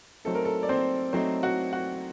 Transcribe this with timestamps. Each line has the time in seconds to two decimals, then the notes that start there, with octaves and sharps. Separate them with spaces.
0.25 F#3 A3 C4 D#4 A4
0.35 A#4
0.45 A4
0.63 D5
0.69 C4 C5
1.13 F#3 A3 C4 D#4 C5
1.43 F#4 F#5
1.73 F#4 F#5